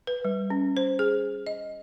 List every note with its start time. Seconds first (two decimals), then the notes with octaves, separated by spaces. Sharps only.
0.07 B4
0.25 G3
0.50 C#4
0.77 C5
0.99 G#4
1.47 D#5